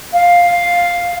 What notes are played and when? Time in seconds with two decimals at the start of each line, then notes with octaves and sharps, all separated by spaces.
0.13 F5